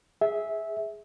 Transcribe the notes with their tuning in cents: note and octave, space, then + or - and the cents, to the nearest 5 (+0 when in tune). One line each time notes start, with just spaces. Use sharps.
G#4 +0 E5 -15